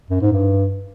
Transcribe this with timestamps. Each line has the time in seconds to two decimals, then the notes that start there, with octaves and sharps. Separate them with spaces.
0.10 F#2
0.21 G#2
0.32 G2